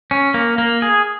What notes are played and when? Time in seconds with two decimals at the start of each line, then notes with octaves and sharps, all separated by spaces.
0.11 C#4
0.34 A#3
0.58 A#3
0.82 G#4